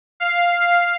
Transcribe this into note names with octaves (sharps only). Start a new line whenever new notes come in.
F5